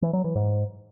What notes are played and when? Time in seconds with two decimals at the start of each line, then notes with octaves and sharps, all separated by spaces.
0.02 E3
0.13 F#3
0.24 E3
0.35 G#2